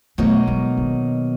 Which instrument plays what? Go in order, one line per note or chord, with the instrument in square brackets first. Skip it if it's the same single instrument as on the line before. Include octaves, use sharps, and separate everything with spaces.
[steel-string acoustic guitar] B2 F#3 A#3 D#4 [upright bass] A3
[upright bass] G#3
D#3